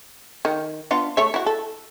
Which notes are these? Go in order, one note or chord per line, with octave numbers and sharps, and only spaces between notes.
D#3
B3 D4 F4
A3 C#5 E5
E4 F#4
A4